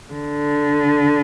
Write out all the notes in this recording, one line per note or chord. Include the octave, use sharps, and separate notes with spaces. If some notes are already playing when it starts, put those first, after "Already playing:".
D3